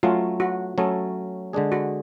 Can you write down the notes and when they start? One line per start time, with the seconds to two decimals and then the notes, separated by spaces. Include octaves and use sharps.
0.03 F#3 A3 C#4 F4
0.40 F#4
0.78 F#3 A3 C#4 A4
1.53 D3 G#3 D4 G#4
1.72 F#4